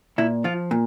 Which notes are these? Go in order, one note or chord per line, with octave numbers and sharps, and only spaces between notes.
A#2 E4
F3 F4
A#2